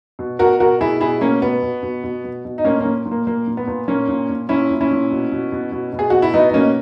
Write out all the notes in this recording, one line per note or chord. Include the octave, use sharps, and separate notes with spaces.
B2
B2 F#4 A#4
B2 F#4 A#4
B2 E4 G#4
B2 E4 G#4
B2 A#3 C#4
B2 B3
B2
B2
B2
B2
B2
D#4
A#2 A#3 C#4
A#2 A#3 C#4
A#2
A#3
A#2 A#3
A#2
B3
A#2
A#2 A#3 C#4
A#2
A#2
A#2 C#4 E4
A#2
C#4 E4
A#2
B2
B2
B2
B2
B2
G#4
B2 F#4
E4
B2 B3 D#4
D#4
B2 A#3 C#4